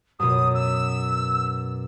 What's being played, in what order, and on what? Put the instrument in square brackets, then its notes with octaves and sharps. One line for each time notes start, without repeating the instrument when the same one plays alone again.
[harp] F#2 B2 [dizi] D#6
[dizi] E6